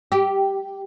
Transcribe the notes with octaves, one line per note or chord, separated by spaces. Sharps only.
G4